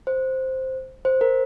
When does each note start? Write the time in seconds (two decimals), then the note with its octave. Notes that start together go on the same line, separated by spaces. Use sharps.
0.07 C5
1.05 C5
1.21 A#4